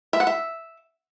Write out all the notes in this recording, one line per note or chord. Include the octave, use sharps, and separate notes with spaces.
E5
F#5
E5